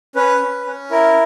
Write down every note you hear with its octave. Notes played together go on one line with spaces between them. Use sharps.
C#4 B4
C#4
C#4
E4 A#4